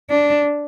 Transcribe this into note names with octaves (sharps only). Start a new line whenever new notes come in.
D4